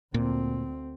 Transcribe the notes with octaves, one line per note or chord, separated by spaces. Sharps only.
D2 A#2 C4